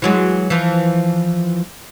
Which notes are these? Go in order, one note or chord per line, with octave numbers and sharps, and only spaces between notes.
E3 F#3 G#3
E3 F3